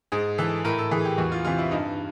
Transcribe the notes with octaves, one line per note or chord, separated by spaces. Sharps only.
G#2 G#4
E3 A4
A2 A#4
A4
E3 G#4
G4
E2 F#4
F4
C3 E3 F4
E4
G2 D#4